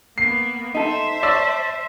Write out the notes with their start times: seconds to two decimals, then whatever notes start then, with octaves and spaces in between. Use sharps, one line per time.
0.18 A#3 B3 C7
0.75 D#4 A4 C5 E5
1.23 C#5 D5 A5 E6